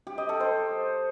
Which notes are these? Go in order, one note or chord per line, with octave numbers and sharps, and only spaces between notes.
G4
D#5
A4
C5